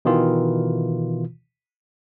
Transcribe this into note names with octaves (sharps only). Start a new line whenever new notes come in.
B2 D#3 E3 F4